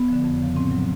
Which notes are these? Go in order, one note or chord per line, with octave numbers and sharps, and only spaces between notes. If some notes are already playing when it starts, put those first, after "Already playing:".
Already playing: B3
D3 F3
F2
C#3 F3
A2 C4
F#3